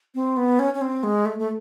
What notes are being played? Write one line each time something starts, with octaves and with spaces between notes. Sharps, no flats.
C4
B3
C#4
C#4
C4
G#3
A3
A3